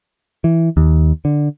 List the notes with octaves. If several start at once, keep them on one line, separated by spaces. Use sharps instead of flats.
E3
D#2
D3